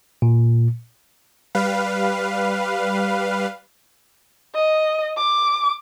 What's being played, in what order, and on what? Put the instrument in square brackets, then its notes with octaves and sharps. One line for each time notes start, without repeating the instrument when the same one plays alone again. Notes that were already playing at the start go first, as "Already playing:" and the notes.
[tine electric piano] A#2
[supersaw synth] G3 B4 F5
[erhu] D#5
D6